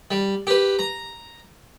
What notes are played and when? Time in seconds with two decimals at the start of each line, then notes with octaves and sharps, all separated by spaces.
0.11 G3
0.47 G4 B4
0.79 A#5